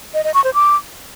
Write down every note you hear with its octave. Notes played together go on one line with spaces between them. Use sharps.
D#5
D#5
C#6
C5
D6